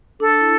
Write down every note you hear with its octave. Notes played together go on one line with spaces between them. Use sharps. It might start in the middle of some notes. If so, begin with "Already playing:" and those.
D4 A4
E4